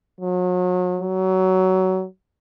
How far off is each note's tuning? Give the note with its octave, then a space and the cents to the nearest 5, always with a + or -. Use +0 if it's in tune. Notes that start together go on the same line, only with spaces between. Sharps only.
F#3 -35
F#3 +20